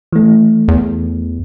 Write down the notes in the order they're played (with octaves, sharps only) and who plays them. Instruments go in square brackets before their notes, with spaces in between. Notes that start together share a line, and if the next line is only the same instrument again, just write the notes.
[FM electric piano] E3 A3
[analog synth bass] E2